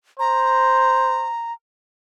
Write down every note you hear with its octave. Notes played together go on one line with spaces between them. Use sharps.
C5 A#5